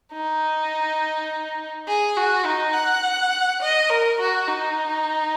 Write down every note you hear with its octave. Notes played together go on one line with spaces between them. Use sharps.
D#4
G#4
F#4
D#4
F#5
D#5
A#4
F#4
D#4